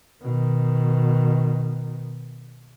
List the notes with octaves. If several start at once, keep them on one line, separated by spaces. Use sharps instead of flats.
B2 D#3